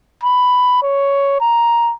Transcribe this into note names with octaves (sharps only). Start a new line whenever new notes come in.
B5
C#5
A#5